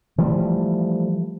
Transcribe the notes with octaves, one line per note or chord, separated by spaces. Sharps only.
E3 F3 G3 A3